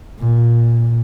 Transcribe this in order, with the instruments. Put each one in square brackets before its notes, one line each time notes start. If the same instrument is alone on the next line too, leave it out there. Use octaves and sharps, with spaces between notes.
[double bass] A#2